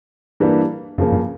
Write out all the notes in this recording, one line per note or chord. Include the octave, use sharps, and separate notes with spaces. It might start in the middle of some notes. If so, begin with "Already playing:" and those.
G2 E3 G3 A#3
F#2 C#3 F3 A#3
G2